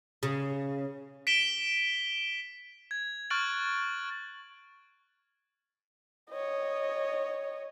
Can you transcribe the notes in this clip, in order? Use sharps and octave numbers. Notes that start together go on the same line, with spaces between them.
C#3
B6 D7 E7 G7
G#6
C#6 F6 F#6 A6 D7 F#7
C#5 D#5